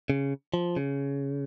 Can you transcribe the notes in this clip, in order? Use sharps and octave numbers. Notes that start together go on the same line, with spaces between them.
C#3
F3
C#3